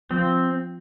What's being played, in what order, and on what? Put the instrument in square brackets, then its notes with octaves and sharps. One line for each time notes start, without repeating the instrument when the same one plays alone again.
[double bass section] F3 [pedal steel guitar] C4